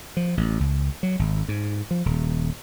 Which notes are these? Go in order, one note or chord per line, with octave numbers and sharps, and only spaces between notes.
F3
A1
C#2
F#3
G#1
G#2
F3
D#1